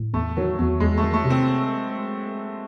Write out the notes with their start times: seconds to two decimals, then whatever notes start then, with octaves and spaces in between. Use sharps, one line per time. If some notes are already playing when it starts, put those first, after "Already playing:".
Already playing: A2
0.14 E2 A3
0.37 D#3 F#3
0.59 E2 F#3
0.80 E2 G#3
0.97 A3
1.03 D#3
1.14 A3
1.25 C3
1.30 C4